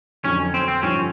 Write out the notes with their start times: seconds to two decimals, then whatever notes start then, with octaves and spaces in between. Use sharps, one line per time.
0.24 F2 D3 F#3 C#4
0.54 C4
0.68 C4
0.82 G2 D3 F3 C#4